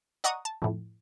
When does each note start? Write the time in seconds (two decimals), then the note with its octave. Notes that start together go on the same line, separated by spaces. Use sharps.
0.24 D5 D#5 F#5 A#5 C#6 D#6
0.45 A5
0.62 F2 A2